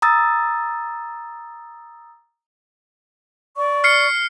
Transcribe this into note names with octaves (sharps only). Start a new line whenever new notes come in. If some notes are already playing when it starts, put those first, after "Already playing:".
A#5 D#6 E6 A6
D5 C#6
F6 C7 C#7